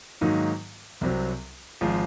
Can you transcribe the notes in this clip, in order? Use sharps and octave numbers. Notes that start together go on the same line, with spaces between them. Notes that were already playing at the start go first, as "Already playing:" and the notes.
G#2 D#3 F#3 A#3 D#4
C2 C3 F#3 C4
G#1 F3 G#3